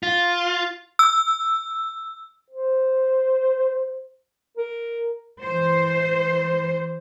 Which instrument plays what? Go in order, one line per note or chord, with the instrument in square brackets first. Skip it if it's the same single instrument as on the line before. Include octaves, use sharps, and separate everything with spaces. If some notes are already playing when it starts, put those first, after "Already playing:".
[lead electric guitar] F4
[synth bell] E6
[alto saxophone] C5
A#4
[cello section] E3 C5